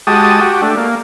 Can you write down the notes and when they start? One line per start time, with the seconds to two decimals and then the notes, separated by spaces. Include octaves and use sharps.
0.07 G#3 F#4 G4 A5 D#6
0.41 F#4 G4
0.62 A3 D4
0.77 A#3